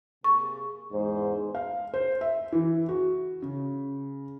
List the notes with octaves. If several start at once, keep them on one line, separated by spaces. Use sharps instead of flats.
C3 A#3 G#4 C#6
E2 G#2 C5
F5
C5
E5
E3
F#4
C#3